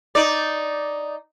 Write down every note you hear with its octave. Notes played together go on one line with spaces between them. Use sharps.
D#4 D5